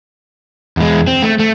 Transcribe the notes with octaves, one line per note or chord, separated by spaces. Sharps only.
E2 G#3
C4
A3
A3